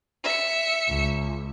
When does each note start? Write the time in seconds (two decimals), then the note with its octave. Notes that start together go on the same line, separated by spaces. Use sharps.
0.24 E5 C#7
0.88 C#2